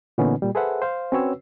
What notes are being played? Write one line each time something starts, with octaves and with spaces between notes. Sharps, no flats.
A#2 D3 E3 B3 C#4 D#4
A#2 G3
G#4 A4 B4 C5 E5 F#5
C5 F5
C4 C#4 F#4 B4 C#5 E6